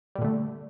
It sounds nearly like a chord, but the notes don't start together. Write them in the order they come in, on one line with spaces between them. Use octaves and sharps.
G3 A#2 D3 A3